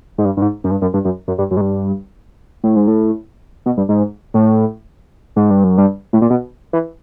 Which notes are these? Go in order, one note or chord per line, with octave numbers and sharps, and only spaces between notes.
G#2
G2
G2
G#2
F#2
G2
F#2
G2
F#2
F#2
G2
F#2
G#2
G2
A2
G#2
A2
B2
G2
G#2
A2
G#2
G2
F#2
G2
A2
A#2
B2
E3